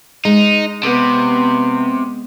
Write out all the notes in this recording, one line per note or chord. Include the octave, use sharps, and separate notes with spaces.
G#3 D#4
C3 B3